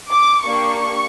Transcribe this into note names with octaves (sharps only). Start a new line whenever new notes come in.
D6
A#3 D4 G4 C#6